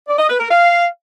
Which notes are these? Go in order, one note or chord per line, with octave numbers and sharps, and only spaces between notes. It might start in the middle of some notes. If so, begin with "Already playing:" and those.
D5
D#5
B4
A#4
F5